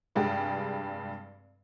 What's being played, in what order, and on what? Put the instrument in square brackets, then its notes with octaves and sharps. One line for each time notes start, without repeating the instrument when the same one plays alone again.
[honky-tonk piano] F1 G2 G#3 G4